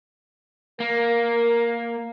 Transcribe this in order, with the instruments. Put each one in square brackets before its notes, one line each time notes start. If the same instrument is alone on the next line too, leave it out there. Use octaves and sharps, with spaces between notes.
[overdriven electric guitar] A#3 [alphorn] A#4